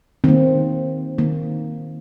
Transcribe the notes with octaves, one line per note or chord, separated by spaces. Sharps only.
D#3 A#3 C4
D#3 A#3